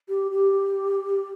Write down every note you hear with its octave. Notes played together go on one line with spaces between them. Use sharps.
G4
G4